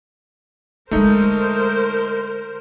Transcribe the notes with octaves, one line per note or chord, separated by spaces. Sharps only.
D3 G#3 A3 D#4 A#4 C5